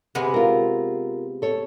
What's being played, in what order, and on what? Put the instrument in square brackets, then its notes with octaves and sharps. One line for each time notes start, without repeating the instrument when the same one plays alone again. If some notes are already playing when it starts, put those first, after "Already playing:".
[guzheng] C3 G#3 B3
[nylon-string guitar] F4 A#4
A4 C#5